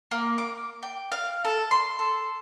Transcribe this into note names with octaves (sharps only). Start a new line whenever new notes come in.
A#3
D6
G5
F5
A4
C6
A4